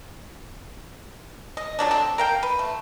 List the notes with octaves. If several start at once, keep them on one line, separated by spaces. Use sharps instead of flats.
D#5
D3 F3 F#3 D4
C4 A4
A#4 F5 G5
B4
A3